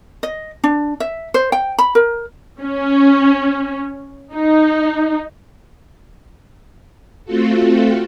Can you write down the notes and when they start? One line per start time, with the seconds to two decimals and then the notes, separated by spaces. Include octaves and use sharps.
0.23 D#5
0.64 D4
1.00 E5
1.34 C5
1.52 G5
1.78 B5
1.95 A#4
2.60 C#4
4.33 D#4
7.25 A3 C4 F4 F#4 A4